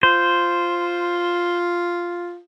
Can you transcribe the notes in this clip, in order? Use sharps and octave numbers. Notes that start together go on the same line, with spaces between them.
F4 C5